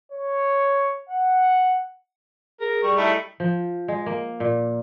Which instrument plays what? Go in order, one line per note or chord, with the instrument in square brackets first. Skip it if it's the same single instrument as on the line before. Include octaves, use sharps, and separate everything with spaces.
[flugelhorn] C#5
F#5
[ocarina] G#4 [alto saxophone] A#4
[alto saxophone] G3 [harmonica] C#6
[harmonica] A3 D#4 E4
[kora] F3
G#3
A#3
A#2